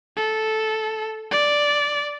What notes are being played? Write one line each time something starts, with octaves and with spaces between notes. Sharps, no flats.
A4
D5